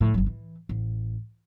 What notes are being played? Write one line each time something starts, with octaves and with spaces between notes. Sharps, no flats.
A2 F3
G1 F#3
E3
A1